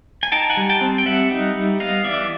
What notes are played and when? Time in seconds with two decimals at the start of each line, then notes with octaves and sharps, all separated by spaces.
0.23 G#5
0.32 D#4 G5 A5
0.50 F#5 G#5
0.57 G3
0.70 G5 A5
0.81 C4
0.98 G5
1.06 G3 E5 F#5
1.31 D#4
1.55 G3
1.80 B3 D#5 F5
2.04 E3 D5 E5